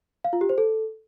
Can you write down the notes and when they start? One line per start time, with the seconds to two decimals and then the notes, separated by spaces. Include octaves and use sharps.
0.24 F5
0.33 F4
0.41 G4
0.49 C5
0.58 A4